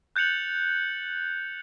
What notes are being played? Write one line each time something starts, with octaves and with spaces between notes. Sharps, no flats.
F#6 G6 A6 C#7 F7 F#7